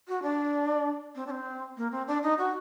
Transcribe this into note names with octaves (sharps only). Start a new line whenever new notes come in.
F#4
D4
C4
D4
C4
A#3
C4
D4
D#4
F#4